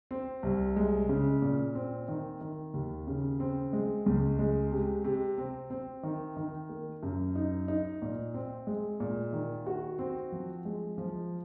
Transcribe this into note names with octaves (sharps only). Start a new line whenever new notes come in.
C4
C2
G#3
C#3
A#2
C4
D#3
D#3
D#2
C#3
C4
G#3
C#2
G#3
C3
C3
C4
C4
D#3
D#3
A#3
F#2
D#4
D#4
A#2
C4
G#3
A#2
D#3
F#4
C4
F3
G#3
F3